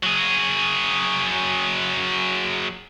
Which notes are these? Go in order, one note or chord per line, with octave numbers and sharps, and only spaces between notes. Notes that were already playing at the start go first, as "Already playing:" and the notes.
F#3 G#4